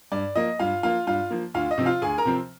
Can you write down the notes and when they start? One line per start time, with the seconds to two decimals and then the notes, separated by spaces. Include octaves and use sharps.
0.12 G2 D5
0.35 F3 A#3 D#5
0.59 G2 F4 F5
0.83 F3 A#3 F4 F5
1.07 G2 F4 F5
1.31 F3 A#3
1.54 D2 F4 F5
1.71 D#5
1.78 C3 F3 C4
1.86 F4 F5
2.02 D2 G#4 G#5
2.18 A#4 A#5
2.25 C3 F3 C4